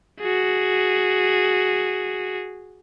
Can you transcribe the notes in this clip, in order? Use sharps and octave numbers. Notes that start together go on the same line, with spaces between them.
F#4 G#4